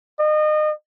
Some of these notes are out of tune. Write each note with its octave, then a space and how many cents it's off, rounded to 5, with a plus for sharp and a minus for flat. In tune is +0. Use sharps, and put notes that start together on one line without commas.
D#5 -30